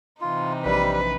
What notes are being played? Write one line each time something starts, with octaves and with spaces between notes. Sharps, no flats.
C3 E3 D#4 F4
A#1 G3 B4